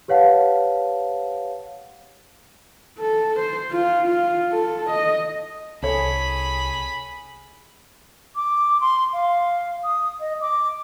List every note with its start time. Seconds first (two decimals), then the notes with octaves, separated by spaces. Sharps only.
0.08 G4 B4 C#5 F5 F#5 A5
2.99 A4
3.39 C5
3.71 F4
4.07 F4
4.51 A4
4.90 D#5
5.82 C2 G#4 A4 C#5 B5
8.35 D6
8.81 C6
9.13 F5
9.83 D#6
10.20 D#5
10.41 D6